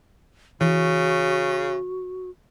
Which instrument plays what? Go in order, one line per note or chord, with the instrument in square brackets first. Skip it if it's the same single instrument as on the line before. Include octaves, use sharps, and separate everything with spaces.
[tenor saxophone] C#3 [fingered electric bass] E3 [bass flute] F#4